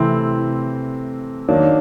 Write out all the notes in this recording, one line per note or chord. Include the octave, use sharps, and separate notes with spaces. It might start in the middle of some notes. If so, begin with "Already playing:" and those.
Already playing: C3 E3 A3 C4 E4
D#3 F#3 A#3 D4